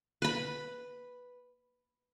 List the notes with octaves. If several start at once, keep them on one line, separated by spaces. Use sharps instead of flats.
B4 B5